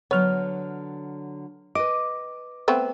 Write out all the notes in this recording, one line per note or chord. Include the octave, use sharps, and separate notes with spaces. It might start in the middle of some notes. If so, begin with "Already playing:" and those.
D3 F#3 B3 C#5 F6
B4 D#5 D6
A3 B3 C4